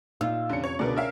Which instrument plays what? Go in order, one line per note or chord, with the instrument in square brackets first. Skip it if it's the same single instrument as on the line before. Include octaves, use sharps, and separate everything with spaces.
[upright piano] A#2 D#4 E6 [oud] F4
[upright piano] F1 C#4 C#7 [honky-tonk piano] D3
[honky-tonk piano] C#5
[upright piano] C#2 B2 D3 [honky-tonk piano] B3 A#4 D5
[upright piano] C#4 [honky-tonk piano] A#4 E5 F5